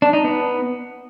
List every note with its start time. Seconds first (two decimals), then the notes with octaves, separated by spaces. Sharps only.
0.02 D4
0.13 D#4
0.24 B3